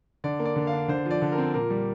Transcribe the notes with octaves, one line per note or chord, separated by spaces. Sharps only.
D3 D5
A#3
D5
D3
F5
D4
D3 C5
F3
D5
D3
A#4
C4
A#2 A#4
G3